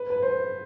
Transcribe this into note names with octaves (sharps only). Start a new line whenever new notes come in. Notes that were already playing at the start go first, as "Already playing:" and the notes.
Already playing: B4
B4
C5